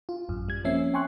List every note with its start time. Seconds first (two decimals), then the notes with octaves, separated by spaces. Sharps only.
0.09 F4
0.29 A1 F#2
0.48 G3 G#6
0.64 F3 A#3 C4 C#4 E5 C7
0.94 G5 G#5 C6 C#6 F#6